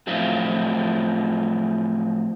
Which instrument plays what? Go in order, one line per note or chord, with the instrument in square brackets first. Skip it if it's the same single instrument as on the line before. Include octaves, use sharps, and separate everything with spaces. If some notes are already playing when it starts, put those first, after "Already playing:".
[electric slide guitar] A2 F3 F#3 C4 E4 F4